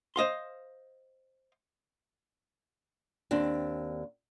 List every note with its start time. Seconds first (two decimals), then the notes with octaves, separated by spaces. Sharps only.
0.16 C5 D#5 F5 C6
3.31 D#2 C4 D4